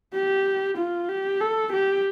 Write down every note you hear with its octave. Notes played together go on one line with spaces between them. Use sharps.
G4
F4
G4
A4
G4